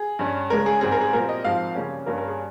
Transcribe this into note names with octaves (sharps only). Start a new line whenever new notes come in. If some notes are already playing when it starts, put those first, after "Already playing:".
Already playing: G#4
G2 G3 C#4
C#3 G#3 C#4 A#4
G#4
G#2 G3 C4 G#4
A#4
G#4
A#2 G3 C4 A#4
D#5
G#2 F3 C4 F5
C#3 G3 A#3 C#4
G2 G3 A#3 C#4 A#4
A#4
G#4